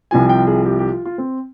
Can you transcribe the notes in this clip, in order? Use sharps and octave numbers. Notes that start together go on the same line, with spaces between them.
C2 C3 F3 G#5
G5
G#4
G4
G4
F4
F4
C4